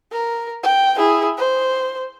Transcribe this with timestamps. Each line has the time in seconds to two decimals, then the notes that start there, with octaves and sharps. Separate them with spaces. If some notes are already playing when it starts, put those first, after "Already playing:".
0.12 A#4
0.63 G5
0.97 E4 G#4
1.37 C5